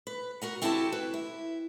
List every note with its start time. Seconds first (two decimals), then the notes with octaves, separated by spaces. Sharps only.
0.07 B4
0.42 F#4 A#4 F#5
0.62 C4 E4 F#4 G4 A4 A5
0.92 B4
1.14 E4